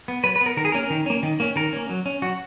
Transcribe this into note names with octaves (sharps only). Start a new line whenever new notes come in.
B3
F#3 B4
B4
B3
A#4
D#3 A#4
G#4
A#3 C#4 A#4
D#3
A#3 C#4
D#3
A#3 C#4
D#3 A#4
A#3 C#4
F#3
C#4
F#3 F#4